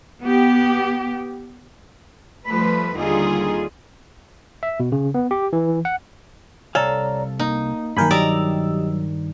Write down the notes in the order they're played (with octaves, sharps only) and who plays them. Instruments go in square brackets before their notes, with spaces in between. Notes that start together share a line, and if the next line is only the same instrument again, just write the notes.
[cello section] B3 G4
F3 G3 A3 B4
D#2 D3 G3 D#4 F4 G#4
[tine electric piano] E5
B2
C#3
B3
G4
E3
F#5
[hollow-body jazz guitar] C2 F5 G#5 [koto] A4 [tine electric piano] C#5 D5 A#5
[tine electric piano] A#3 [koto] D#4
[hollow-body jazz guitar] G2 D#3 [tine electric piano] F#3 A#3 G6 [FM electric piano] A#4 G#5 B5
[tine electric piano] F#3 [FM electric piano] G4 D#5 E6 [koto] A#4 D5 A#5